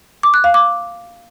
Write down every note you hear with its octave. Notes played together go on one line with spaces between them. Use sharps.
D6
F#6
F5
D6